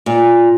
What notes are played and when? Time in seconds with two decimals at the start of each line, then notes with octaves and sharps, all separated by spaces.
0.06 A#2